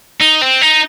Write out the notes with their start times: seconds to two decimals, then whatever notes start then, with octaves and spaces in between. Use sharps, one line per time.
0.21 D#4
0.42 C4
0.61 D#4